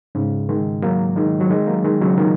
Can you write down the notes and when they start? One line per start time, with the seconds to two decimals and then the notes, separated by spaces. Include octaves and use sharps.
0.15 G#2 C#3
0.49 D#3 G#3
0.82 F#3 A#3
1.16 D#3 G#3
1.40 F#3
1.50 D#3 G#3
1.67 F#3 A#3
1.84 D#3 G#3
2.01 C#3 F#3
2.17 A#2 D#3